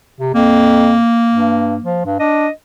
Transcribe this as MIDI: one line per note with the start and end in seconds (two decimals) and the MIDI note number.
0.20 0.32 48
0.35 0.98 41
0.35 2.09 58
1.32 1.76 43
1.84 2.04 53
2.06 2.16 43
2.19 2.47 62
2.19 2.51 75